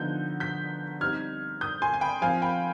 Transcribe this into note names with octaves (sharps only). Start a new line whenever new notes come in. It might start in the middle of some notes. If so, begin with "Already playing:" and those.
Already playing: D3 F3 B3 D#4 G6
G6 B6
G3 C4 D#4 F6 G#6
D#6 G6
G#5 C6
G#5
G5 B5
F3 C4 F4 F5 G#5
G5 B5